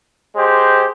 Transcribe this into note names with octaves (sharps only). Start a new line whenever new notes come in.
G#3 G4 C5